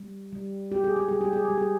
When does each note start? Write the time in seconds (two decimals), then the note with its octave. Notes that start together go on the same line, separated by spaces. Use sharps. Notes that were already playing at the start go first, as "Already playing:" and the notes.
Already playing: G3
0.32 G3
0.72 G3 G4
0.84 G#4
0.96 G4
1.08 G3 G#4
1.21 G4
1.33 G#4
1.45 G4
1.50 G3
1.58 G#4